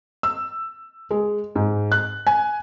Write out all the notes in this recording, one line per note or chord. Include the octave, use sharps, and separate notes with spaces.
E6
G#3
G#2
F#6
G#5